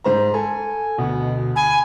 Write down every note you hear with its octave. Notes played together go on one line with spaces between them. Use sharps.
G#2 C5 A#5
A4 G#5
D2 B2 B3
G#5 B5